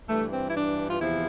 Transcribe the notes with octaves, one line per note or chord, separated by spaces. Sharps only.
G2 E3 A3
C4
E4
D4
F4
E2 C3 F3 E4